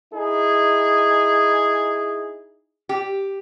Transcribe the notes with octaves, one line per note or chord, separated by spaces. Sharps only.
D#4 E4 G#4
G4